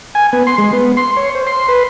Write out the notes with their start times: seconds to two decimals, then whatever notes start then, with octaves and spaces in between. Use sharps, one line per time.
0.15 G#5
0.33 B3
0.47 C6
0.58 G#3
0.73 B3
0.97 C6
1.17 C#5
1.35 C5
1.47 C6
1.68 B4